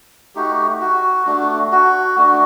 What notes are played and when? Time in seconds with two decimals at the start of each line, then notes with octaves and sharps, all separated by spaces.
0.35 A3 D#4 F#4 G4
0.81 F#4
1.27 A3 D4 F#4
1.72 F#4
2.18 A3 D4 F#4